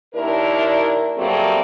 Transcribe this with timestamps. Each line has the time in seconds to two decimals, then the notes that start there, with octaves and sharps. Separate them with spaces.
0.14 D#2 D4 E4 A#4
1.17 F#3 G3 A3 A#3 C4 G#4